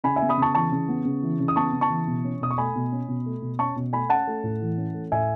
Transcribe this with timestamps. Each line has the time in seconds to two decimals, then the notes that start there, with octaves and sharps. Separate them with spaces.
0.04 C#3 G#5 B5
0.16 E5 G#5
0.22 B3
0.29 B5 D#6
0.38 C#3 A5 C#6
0.55 E3 A5 C#6
0.72 C#3
0.88 B3
1.05 C#3
1.23 E3
1.40 C#3
1.48 D#6
1.56 B3 A5 C#6
1.73 C#3
1.81 A5 C#6
1.90 E3
2.07 B2
2.24 C#4
2.41 B2 D#6
2.51 C#6
2.58 A3 G#5 B5
2.75 B2
2.92 C#4
3.08 B2
3.26 A3
3.42 B2
3.59 C#4 A5 C#6
3.76 B2
3.93 A3 G#5 B5
4.10 C#4 F#5 A5
4.27 A3
4.43 A2
4.61 E3
4.78 C#4
4.94 A3
5.12 A2 E5 G#5